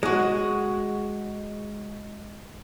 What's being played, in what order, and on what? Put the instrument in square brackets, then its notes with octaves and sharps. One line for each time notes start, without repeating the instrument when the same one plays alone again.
[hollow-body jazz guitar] G#3 F#4